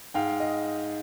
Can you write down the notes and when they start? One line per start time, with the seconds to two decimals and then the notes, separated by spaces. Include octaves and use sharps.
0.14 G#2 F5 G5
0.40 D#5